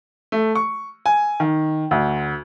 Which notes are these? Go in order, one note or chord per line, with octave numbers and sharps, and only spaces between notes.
A3
C#6
G#5
D#3
D2